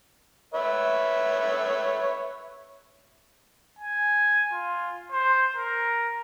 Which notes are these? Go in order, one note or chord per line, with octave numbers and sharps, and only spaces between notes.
B4 C#5 E5
G#5
F4
C5
A#4